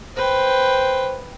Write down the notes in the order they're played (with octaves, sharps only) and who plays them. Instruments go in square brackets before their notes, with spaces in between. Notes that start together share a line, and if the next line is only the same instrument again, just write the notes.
[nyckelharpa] B4 G5 [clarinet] C5